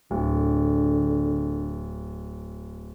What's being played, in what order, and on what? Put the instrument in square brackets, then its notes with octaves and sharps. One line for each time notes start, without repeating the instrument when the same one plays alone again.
[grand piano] D1 [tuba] D3